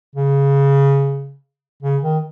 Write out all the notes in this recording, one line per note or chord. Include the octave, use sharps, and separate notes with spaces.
C#3
C#3
D#3